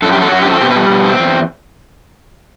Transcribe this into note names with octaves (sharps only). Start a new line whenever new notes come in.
F#2 A4
G4
F#3 A4
F#2 F#4
G4
C4
A4
B2 G4
B4
G3
B2
C4
E2